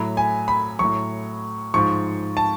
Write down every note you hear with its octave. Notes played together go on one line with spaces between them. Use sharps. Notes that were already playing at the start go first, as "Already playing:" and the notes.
Already playing: A2 F#3 B5
G#5
B5
A2 F#3 C#6
G#2 F3 C#6
A5